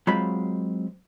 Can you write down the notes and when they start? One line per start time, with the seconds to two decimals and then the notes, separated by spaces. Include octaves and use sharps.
0.07 F#3 G#3 C4 F4 B5